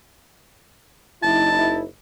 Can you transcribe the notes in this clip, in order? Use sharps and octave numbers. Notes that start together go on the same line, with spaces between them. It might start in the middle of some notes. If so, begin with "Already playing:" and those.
F#1 D#4 E4 A5